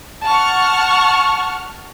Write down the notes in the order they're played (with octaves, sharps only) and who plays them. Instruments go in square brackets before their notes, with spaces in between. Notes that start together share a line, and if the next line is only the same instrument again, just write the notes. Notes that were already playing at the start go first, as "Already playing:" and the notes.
[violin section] F#5 A5 C#6 F6